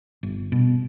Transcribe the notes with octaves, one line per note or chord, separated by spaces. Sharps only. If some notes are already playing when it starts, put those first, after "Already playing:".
G1
B2